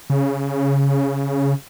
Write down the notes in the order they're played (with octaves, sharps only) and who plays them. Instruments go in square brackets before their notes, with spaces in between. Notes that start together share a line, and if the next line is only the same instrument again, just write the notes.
[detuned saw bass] C#3